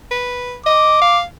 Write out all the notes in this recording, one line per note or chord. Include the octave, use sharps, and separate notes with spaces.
B4
D#5 D6
F5